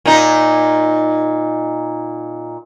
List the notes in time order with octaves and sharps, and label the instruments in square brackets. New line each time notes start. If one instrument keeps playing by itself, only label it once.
[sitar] A#2 D#4